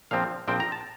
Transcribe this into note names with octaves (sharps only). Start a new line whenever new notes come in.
A#1 A#2 F3 C4 F5
A#1 A#2 F3 C4 G5
A#5
A5